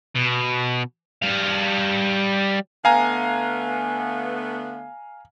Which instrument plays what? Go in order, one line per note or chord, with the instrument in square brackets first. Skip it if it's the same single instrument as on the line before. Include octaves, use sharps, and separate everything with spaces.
[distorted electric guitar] B2
G3 F5
[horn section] D3 A3 B3 [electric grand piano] F5 G#5 A#5